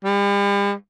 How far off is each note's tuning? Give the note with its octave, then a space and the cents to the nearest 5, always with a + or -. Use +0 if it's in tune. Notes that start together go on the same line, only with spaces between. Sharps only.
G3 +40